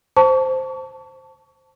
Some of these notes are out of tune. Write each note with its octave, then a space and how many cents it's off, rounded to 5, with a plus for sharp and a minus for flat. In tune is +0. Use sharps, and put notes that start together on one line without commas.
C5 +0 A5 +10 C#6 +35